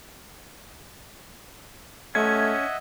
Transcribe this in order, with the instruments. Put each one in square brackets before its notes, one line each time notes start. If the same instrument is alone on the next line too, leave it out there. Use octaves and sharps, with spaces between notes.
[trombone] A3 [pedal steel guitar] C#4 [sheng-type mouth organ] D#5 E5 F#5 [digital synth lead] G#6